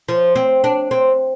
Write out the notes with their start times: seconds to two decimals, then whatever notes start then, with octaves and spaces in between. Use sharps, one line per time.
0.08 F3
0.35 C4
0.64 D4
0.91 C4